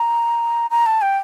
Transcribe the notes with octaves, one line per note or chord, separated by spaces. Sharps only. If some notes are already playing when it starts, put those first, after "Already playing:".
Already playing: A#5
A#5
A5
G5